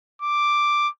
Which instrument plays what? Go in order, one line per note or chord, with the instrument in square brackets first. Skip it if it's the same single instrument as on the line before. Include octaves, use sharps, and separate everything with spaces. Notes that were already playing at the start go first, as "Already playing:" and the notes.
[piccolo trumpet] D6